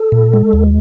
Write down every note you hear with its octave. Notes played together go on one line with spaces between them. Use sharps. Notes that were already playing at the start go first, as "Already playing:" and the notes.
Already playing: A4
A#2
G#3
D#2